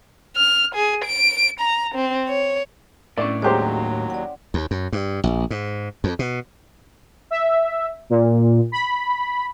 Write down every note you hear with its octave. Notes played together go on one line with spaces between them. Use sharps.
F6
G#4
D7
A#5
C4
C#5
A2 C#4 D4 E4 D5
D#2 F#3 G#3 G4 C5 C#5 A#5 D6
D5 F#5
D#2
F#2
G2
A#1
G#2
F2
B2
E5
A#2
B5